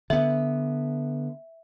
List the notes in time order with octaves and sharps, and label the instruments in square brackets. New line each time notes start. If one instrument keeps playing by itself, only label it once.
[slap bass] D3 B3 [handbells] E5